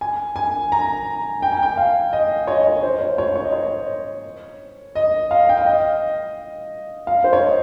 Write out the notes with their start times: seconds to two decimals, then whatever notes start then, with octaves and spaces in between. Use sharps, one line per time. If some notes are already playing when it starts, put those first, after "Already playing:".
0.01 G#5
0.36 G#5
0.72 A#5
1.42 G5
1.52 G#5
1.63 G5
1.77 F5
2.13 D#5
2.47 C#5
2.57 D#5
2.67 C#5
2.83 C5
3.01 C#5
3.18 C#5
3.36 C#5
3.44 D#5
3.52 C#5
4.95 D#5
5.31 F5
5.49 G5
5.57 F5
5.66 D#5
7.07 F5
7.24 C5
7.33 C#5
7.43 D#5